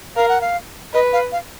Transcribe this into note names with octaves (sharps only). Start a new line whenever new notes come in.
A#4 F5
F#5
F5
B4 D#5
F5
F5